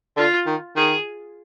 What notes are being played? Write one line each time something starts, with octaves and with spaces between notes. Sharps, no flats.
D3 F4
D#3
D#3 G#4